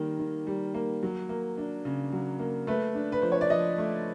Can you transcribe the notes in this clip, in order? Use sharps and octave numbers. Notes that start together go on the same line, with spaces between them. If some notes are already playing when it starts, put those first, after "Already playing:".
Already playing: D#3 G3 A#3
D#3
G3
A#3
F#3
A#3
D4
C#3
F#3
A#3
A3 B4
D4
B4
F3 C5
C#5
D5
F3 D#5
A3